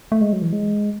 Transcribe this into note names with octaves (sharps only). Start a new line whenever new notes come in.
A3
G#3
F#3
E3
G#3